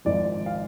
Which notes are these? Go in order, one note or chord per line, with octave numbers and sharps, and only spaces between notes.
G#1 G#2 F3 D5
F5